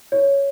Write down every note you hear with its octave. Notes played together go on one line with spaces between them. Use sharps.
C#5